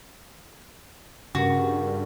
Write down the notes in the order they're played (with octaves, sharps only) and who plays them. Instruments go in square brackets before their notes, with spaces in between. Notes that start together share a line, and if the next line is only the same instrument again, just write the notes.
[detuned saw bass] G2 [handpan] C#3 [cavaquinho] F#4 [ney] A#4